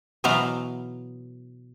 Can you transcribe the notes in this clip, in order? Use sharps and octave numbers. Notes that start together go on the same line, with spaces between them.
B2 E3 F#3 B3 F5 A#5